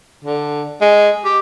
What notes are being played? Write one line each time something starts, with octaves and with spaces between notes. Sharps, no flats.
D3
G#3
G4